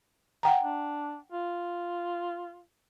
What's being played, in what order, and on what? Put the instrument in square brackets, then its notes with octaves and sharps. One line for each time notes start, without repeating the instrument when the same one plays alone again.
[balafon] F#5 G5 A#5
[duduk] D4
F4